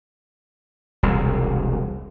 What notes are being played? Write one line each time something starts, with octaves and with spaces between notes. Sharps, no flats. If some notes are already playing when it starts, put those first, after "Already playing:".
E1 C2